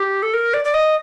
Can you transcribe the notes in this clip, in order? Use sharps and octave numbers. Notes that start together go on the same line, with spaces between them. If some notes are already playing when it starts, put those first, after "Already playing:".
Already playing: G4
A4
A#4
D5
D5
D#5